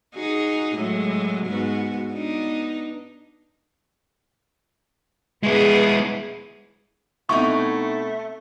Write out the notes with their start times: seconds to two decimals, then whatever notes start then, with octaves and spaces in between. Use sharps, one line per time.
0.15 D#4 F#4 G#4
0.75 A2 F#3 G#3
1.46 G#2 B3 F#4
2.11 B3 D4 D#4
5.43 G#3 B3 E4 G#4 B4
7.29 B2 A3 C4 D#4 E4 F#4 C#6